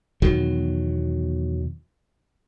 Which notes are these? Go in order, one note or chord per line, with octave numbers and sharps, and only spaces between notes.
E2 B2 D#3 F#3